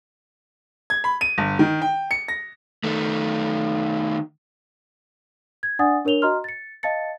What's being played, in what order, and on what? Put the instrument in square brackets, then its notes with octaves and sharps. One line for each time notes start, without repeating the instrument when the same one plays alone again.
[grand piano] G#6
B5
D#7
G1
D#3
G5
C#7
A#6
[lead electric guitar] D#3 A3
[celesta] G#6
D4 D5 F#5 G#5 D#6 A6
D4 A#4 C#5 F7 G7
F#4 D#5 A#5 C6 F6
A6 C#7
D#5 F5 A5 A6 C#7